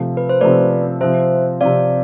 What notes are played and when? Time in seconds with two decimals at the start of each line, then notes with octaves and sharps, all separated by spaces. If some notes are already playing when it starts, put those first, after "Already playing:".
Already playing: C3 F3 A3
0.17 B4
0.29 C5
0.41 C3 F3 A3 B4 D5
1.00 C3 F3 C4 C5 E5
1.61 C3 F3 C4 D5 F5